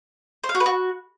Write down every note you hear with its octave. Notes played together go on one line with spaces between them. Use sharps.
C5
F5
F#4
B4
F#4